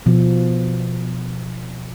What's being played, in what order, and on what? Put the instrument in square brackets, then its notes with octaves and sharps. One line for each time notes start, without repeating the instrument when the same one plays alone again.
[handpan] B2 F3